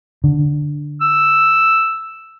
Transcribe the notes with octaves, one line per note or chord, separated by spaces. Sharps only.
D3
E6